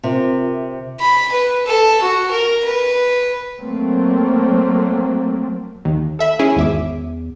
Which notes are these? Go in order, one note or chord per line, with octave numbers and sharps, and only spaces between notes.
C3 F4 A#4 E5
B5
B4
A4
F#4
A#4
B4
F#3 A3 A#3 C4
D#2
A4 E5 B5
C#4 E4 G#4
G#1 E2 E5 D6